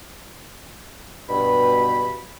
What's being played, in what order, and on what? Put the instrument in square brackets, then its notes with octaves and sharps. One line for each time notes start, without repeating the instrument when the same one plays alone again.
[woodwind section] G2 B2 [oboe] B5